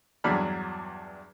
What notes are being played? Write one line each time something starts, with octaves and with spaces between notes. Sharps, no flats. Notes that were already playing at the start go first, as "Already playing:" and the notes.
E2 G2 F#3 D4 B5 F6